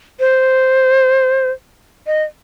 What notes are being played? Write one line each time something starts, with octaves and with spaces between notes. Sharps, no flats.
C5
D#5